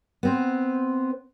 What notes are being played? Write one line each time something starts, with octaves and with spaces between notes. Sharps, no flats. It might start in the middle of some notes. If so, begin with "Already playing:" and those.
B3 C4 C5